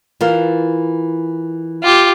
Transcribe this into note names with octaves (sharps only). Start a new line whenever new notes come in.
E3 F4 A#4
F4 G4